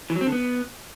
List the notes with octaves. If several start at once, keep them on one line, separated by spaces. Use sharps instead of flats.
E3
F#3
C4
D3
B3